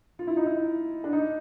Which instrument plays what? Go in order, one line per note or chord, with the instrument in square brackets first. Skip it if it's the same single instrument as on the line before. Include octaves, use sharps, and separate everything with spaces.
[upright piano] F4
E4
D#4
E4
D4
D#4